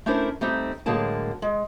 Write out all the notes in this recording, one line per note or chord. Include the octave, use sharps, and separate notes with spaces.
A3 C#4 D4 E4 A#4 C5
G3 A3 C4 D#4 G4
A2 D3 F#3 G#3 A#3 A5
G#3